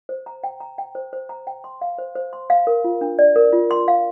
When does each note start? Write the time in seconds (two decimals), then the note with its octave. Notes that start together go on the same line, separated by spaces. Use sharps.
0.09 C5
0.26 A#5
0.43 G5
0.60 A#5
0.78 G5
0.95 C5
1.13 C5
1.29 A#5
1.47 G5
1.64 C6
1.81 F5
1.98 C5
2.15 C5
2.33 C6
2.50 F5
2.67 A#4
2.84 F4
3.01 D4
3.19 D5
3.36 A#4
3.53 F4
3.71 C6
3.88 F5